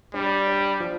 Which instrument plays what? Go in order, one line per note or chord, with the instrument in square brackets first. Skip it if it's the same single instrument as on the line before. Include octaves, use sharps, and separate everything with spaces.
[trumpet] G3 [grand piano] D4
[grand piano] D4
F3